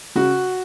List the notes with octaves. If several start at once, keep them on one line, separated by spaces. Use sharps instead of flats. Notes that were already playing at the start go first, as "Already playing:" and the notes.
C#3 F#4